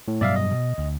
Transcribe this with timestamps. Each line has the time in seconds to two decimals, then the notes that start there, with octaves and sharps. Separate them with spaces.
0.08 A2
0.21 G2 B2 F#3 D5 E5 F5
0.36 D#5
0.51 B2
0.78 D2